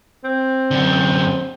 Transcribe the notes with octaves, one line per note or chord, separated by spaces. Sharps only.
C4
F#2 D3